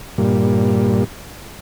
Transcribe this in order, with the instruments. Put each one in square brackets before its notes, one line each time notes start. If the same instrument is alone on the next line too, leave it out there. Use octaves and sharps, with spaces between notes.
[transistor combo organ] G2 A#2